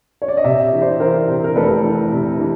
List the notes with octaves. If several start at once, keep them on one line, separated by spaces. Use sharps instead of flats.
C#5
D5
D#5
C3 D5 E5
E3
C5 D5
E3 A#4 C5
C3
A#4
F1 A4 B4
E3
C3
E3